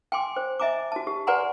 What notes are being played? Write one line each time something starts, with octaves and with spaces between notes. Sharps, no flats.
G5 G#5 C6 D6
C5
D#5 E5 G#5 A#5 D6
F#4 A5
G4
B4 D5 F#5 G#5 A#5 C6